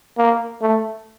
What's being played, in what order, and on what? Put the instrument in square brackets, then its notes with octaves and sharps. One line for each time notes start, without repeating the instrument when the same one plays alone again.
[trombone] A#3
A3